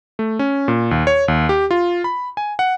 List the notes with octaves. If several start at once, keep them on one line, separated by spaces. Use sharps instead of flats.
A3
C#4
A#2
D#2
C#5
D#2
G4
F4
B5
G#5
F#5